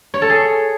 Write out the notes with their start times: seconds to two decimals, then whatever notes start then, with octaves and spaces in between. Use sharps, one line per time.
0.14 C#5
0.22 A4
0.30 G#4